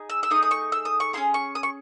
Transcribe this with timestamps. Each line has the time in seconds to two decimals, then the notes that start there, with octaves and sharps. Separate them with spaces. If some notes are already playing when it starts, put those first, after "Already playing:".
Already playing: D#4 G#4
0.10 E6
0.23 E6
0.30 A3 D#4 G#4 D#6
0.43 D#6
0.51 C#6
0.72 E6
0.85 D#6
1.00 C#6
1.13 C#4 E4 G#4 C6
1.34 C#6
1.55 D#6
1.63 C#6